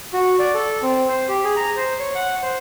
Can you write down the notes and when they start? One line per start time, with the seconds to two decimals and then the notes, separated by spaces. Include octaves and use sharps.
0.13 F#4
0.39 D5
0.54 A4
0.83 C4
1.09 C5
1.28 G4
1.44 G#4
1.56 A#5
1.76 C5
2.00 C#5
2.15 F#5
2.42 C5